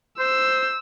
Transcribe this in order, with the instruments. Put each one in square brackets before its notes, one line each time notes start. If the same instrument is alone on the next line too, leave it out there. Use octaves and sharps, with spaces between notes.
[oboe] C5 [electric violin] E6